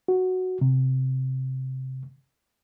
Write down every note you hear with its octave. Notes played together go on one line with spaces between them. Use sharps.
F#4
C3